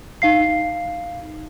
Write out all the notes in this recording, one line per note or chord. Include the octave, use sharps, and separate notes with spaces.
D#4 F5 C7